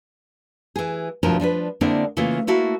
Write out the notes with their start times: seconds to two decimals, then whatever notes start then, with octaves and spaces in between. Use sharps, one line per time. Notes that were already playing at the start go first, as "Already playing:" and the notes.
0.76 E3 G#4
1.23 D2 G2 B2 F3 E4 A#4
1.40 F3 D4 A4 B4
1.81 D3 G#3 A#3 C4 D4 E4
2.17 C#3 E3 A3 A#3 F4
2.47 A3 A#3 E4 F#4 A4 F5